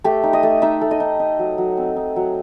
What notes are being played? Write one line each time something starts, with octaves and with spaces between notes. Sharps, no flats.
A3 G4
D#4
D#5
A3
D#4 E5
A3
D#5
D#4
D#4
F#3
F#3
C4
D#4
F#3